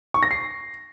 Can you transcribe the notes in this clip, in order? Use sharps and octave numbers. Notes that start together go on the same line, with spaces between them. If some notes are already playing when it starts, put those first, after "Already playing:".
C#6
A#6
C7